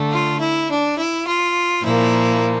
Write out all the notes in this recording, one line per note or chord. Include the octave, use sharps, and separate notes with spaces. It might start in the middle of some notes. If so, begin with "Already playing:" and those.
Already playing: D3 A3
F4
E4
D4
E4
F4
A#2 F3 A#3 E4